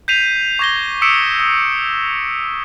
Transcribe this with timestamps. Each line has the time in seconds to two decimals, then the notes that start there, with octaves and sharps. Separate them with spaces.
0.08 G6 B6 C7 D#7 F7
0.59 C#6 D6 G#6 A#6 F7 G7
1.02 D#6 E6 B6 C#7 D7 E7
1.40 D#6